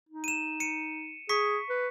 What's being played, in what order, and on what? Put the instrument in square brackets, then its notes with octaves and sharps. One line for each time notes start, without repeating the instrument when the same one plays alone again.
[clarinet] D#4
[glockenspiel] D#7 E7
C#7 D#7
[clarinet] G#4 [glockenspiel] C#6 B6 C#7
[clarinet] B4